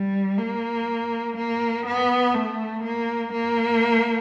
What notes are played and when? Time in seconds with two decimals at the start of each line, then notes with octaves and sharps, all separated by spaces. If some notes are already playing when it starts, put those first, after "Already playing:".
Already playing: G3
0.38 A#3
1.37 A#3
1.86 B3
2.34 A3
2.83 A#3
3.32 A#3